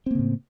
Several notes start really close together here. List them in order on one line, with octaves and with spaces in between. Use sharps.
C4 A#3 C#3 A2